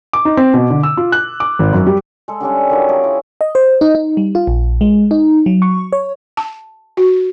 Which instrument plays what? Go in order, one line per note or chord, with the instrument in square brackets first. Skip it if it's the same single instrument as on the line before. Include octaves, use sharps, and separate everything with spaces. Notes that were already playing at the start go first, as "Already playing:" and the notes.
[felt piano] D6
D#4
C4
B2
D3
E6
F4
F#6
D6
G#1
F#2
G3
[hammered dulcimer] G#3 A4
D3 G3 C#4 D4
D#3 F3 F#3
G#4 D5 A5 D6
E4 C#5
[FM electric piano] D#5
C5
D#4
D#4
G3
F4
A#1
G#3
D#4
F#3
C#6
C#5
[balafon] A5
F#4